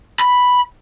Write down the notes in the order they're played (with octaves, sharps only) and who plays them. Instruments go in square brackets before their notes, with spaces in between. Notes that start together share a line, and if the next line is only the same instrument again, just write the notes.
[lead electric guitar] B5